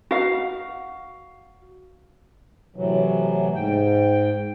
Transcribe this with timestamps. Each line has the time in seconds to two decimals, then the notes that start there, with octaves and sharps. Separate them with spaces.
0.11 F#4 F5
2.76 A2 C3 E3 F#3
3.55 G#2 G5